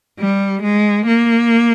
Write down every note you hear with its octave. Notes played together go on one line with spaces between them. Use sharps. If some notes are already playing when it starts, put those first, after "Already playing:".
G3
G#3
A#3